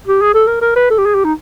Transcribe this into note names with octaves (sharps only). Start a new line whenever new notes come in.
G4
G#4
A4
A#4
A#4
B4
A4
G4
G#4
G4
D#4